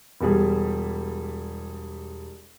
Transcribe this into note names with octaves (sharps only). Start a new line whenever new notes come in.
E1 G3 G#4